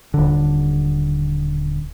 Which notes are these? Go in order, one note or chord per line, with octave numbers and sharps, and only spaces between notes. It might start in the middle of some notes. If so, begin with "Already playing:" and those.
D#1 D3